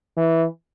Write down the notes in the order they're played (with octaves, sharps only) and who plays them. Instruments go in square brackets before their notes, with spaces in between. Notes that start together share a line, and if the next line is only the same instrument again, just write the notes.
[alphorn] E3